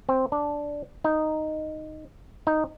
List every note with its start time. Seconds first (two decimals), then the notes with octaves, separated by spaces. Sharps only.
0.09 C4
0.32 D4
1.04 D#4
2.47 D#4